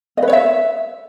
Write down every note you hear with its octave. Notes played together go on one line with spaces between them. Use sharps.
D#5
B4
C#5
E5